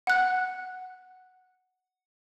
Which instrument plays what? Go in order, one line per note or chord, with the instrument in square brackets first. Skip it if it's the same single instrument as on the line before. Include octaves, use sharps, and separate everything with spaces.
[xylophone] F#5 F#6